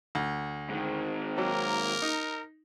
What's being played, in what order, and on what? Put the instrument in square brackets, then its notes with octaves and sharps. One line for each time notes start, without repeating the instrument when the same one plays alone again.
[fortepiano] D2
[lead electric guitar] G#2 D#3
[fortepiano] F#3 [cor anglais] A#3 [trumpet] A#4
[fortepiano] D#4